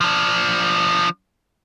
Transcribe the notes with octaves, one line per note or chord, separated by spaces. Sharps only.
F3 D4